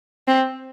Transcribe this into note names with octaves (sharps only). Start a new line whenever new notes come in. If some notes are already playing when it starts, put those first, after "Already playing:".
C4